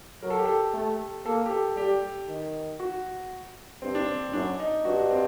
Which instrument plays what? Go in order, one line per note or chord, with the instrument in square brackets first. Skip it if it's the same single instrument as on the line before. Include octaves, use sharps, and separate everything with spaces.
[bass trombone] F#3 [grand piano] A#4
[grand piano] A4
G4
A4
[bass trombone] A3
[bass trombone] A#3 [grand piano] A4
[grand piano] G4
A4
[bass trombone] G3 [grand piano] G4
[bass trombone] D#3
[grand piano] F#4
[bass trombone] G2 [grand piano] C4
[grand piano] D4
C4
[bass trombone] F#2 [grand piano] D4
[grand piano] D#4
[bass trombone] G2 [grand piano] F#4
[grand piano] C4